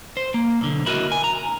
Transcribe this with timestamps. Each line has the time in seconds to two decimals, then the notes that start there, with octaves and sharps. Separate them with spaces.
0.17 C5
0.34 A#3
0.61 B1 D3
0.86 E4 F#4 A#4 C#5 D#5
1.12 G#5
1.24 A#5